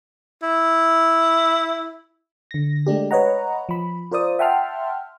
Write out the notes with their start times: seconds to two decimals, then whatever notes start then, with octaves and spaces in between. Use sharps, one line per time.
0.43 E4
2.51 D3 A#6
2.86 G#3 A3 D4 G4
3.11 B4 C#5 D#5 F#5 A#5
3.69 F3 B5
4.11 F4 A#4 C5 D5 D#6
4.39 E5 F#5 G5 A5 C6 F6